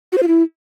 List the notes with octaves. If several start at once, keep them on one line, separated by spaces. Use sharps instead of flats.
F#4
C5
F4
E4